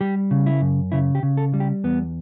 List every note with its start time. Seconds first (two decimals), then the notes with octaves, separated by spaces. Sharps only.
0.01 G3 G4
0.31 C#3
0.46 E4
0.61 F#2
0.92 C#3 E4
1.15 G4
1.23 C#3
1.37 A4
1.54 G3
1.60 G4
1.84 E2 B3